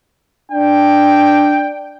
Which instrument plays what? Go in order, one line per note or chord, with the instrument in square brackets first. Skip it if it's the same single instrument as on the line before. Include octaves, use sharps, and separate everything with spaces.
[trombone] D4 [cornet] G5